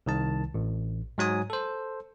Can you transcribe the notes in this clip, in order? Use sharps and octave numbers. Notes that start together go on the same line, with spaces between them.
C2 D#3 A5
A1
G#2 F#3 G#5 D#6
A4 C5